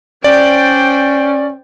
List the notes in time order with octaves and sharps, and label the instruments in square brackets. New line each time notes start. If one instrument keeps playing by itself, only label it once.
[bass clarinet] C#4 [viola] C5 G5 [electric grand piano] D5